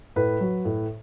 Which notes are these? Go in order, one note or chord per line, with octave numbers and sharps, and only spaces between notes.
A2 B4
F#3
A2